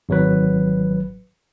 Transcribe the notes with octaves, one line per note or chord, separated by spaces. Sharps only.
G#1 F#3 B4